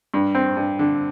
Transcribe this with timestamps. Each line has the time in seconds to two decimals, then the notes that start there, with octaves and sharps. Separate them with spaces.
0.14 G2
0.35 C4
0.57 G2
0.79 D3